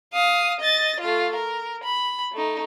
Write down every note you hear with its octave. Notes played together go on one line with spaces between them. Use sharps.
F5 D#6
D#5 A6
A3 F4
A#4
B5
A3 D#4